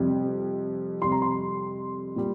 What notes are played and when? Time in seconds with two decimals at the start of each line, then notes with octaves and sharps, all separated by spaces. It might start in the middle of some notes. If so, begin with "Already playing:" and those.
Already playing: F2 C3 G3
1.02 F2 C3 G3 C6
1.12 A#5
1.22 C6
2.16 A#2 G3